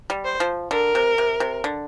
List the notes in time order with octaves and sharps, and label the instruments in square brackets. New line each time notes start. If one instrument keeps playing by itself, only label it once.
[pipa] G3
[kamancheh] C5
[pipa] F3
[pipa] D3 [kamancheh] A#4
[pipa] C3
C3
C3
D3